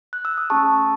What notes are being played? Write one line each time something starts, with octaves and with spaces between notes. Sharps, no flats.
F#6
E6
D#6
A3 C#4 G#4 A5 C#6